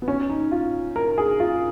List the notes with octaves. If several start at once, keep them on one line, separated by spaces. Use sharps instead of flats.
B3
C#4
D#4
F4
A#4
G#4
F4